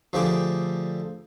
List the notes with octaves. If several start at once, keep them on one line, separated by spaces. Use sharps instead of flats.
D2 F3 A3 G4 G#4 D6